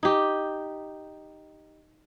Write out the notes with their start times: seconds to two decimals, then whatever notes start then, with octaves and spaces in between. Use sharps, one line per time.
0.03 D#4 G4